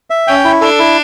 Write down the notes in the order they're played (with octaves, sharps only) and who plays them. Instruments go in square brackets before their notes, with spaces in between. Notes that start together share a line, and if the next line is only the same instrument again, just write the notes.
[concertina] E5
[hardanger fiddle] C#4 [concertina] G5
[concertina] E4
[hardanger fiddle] D4 [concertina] A4
[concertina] E4